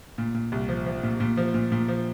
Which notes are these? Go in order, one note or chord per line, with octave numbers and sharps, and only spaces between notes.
A#2
A#2
C2
F3
F3
A#2
A#2
F3
A#2
A#2
F3